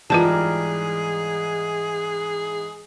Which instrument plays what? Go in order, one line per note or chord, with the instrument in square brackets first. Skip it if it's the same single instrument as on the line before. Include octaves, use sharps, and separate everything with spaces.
[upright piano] G#2 E3 [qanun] G3 A#4 [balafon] F4 B4 A5 [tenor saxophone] G#4